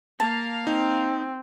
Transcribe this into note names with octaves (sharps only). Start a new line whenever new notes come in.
A#3 F5 A5
C4 D#4